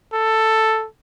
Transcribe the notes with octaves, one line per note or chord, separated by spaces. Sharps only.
A4